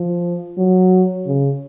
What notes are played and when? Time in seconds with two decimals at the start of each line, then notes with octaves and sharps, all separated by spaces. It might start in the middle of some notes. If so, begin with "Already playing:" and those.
Already playing: F3
0.58 F#3
1.26 C#3